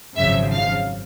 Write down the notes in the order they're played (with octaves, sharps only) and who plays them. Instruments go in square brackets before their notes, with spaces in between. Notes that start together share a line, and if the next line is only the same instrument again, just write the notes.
[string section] G#1 F#2 C#3 F3 E5
F5